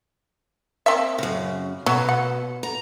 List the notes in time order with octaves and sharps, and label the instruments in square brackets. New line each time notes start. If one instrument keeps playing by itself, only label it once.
[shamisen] A#3 C4 E5
[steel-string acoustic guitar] F#2 C#3
[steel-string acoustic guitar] B2 [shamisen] F#3
[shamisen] F#5
[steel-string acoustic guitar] A#5